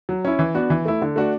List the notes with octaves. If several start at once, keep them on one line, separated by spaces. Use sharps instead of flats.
F#3
C#4 E4
E3
B3 D4 F#4
E3
A3 E4
D3
A3 D4 F#4